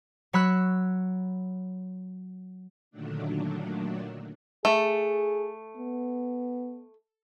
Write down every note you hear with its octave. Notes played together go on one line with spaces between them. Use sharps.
F#3 C#5 B5 E6 F#6
A#2 D3 D#3 F#3 A3 D4
A3 G#4
B3